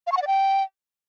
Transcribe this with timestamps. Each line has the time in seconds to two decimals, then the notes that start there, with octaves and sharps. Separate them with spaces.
0.07 F5
0.12 C#6
0.17 F#5
0.22 D5
0.27 G5